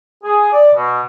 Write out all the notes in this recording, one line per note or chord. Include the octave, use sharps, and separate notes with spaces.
G#4
D5
B2